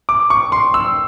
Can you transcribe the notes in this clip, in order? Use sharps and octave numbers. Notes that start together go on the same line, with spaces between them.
D6
C#6
C6
E6